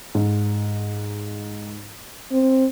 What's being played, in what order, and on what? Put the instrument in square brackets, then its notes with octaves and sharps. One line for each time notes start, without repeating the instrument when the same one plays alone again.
[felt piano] G#2
[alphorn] C4